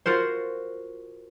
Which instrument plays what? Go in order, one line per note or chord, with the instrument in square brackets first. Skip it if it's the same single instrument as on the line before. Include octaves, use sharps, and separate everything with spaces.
[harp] F4 F#4 A#4 C5